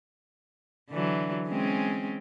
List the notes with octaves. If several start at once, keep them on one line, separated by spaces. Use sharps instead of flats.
D3 E3 F#3
G#3 C4 C#4